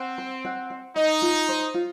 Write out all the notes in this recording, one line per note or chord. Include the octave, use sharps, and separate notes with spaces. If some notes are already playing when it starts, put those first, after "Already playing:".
Already playing: C4 F#5
C5
F#5
F#5
D#4 D#5
F4
C5
F4